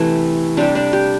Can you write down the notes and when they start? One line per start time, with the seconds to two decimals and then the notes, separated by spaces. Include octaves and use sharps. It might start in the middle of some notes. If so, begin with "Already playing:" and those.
Already playing: C3 E3 A3
0.57 C3 G3 D4
0.75 D4
0.93 G4